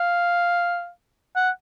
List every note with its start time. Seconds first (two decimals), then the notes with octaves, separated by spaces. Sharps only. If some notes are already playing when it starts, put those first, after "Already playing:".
Already playing: F5
1.36 F#5